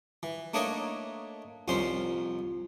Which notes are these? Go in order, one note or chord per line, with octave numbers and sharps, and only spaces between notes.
E3
A3 A#3 D4 D#4 C#5 D#5
C2 F2 D#3 C#4 C5 C6